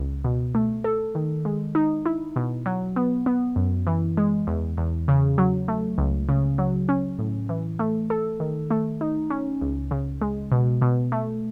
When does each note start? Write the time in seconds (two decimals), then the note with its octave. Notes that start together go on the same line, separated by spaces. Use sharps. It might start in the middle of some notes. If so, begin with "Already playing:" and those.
Already playing: C#2
0.24 B2
0.55 A3
0.84 A4
1.15 D#3
1.45 G#3
1.75 D#4
2.06 E4
2.36 B2
2.66 F#3
2.96 B3
3.26 B3
3.56 F#2
3.87 E3
4.17 G#3
4.47 E2
4.78 E2
5.08 C#3
5.38 F#3
5.68 A3
5.98 C#2
6.29 C#3
6.58 F#3
6.89 C#4
7.19 A2
7.49 E3
7.79 A3
8.10 A4
8.40 D#3
8.71 A3
9.01 D#4
9.30 C#4
9.61 C#2
9.91 C#3
10.21 G#3
10.52 B2
10.82 B2
11.12 A3